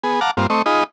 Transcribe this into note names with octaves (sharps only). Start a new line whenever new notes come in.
B3 G#4
F5 F#5 A5 A#5 D6
G2 A#3 C4 F4
A3 C4 D#5 C#6
D#4 F4 G#4 D#5 B5